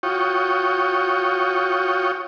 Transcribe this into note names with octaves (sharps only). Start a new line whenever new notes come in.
F4 F#4 C#5 G5 C#6 D#6